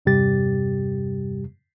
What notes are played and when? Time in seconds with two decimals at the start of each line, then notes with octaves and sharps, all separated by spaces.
0.06 E2 G2 C3 G3 G4 A6